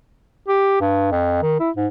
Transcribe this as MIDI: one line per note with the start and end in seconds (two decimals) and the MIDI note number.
0.48 0.77 67
0.81 1.10 43
1.12 1.39 41
1.42 1.58 51
1.60 1.70 64
1.77 1.87 44